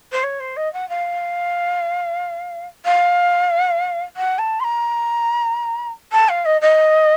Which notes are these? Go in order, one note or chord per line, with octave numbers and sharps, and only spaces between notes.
C5
C#5
C5
D#5
F#5
F5
F5
F#5
A5
C6
A#5
A5
F5
D#5
D#5